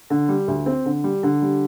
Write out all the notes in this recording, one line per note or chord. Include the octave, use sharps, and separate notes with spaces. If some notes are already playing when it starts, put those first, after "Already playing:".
D3
G3
D2
C4
D3
G3
D3
G3